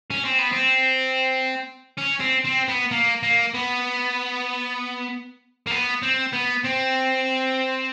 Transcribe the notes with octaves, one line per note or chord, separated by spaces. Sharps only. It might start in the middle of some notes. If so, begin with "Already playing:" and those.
C#4
C4
B3
C4
C#4
C4
C4
B3
A#3
A#3
B3
A#3
B3
C4
B3
C4